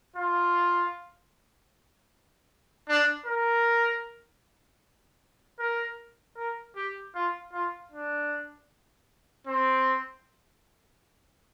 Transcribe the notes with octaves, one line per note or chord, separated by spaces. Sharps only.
F4
D4
A#4
A#4
A#4
G4
F4
F4
D4
C4